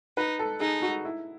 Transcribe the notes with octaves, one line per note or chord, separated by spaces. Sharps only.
D#4 B4
A4
D#4 G#4
F#4
E4